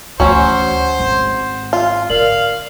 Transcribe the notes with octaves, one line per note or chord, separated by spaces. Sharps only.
D2 E3 F#3 C#4 C5 F#5
G#1
F4
D3 A#4 D5 F5 F#7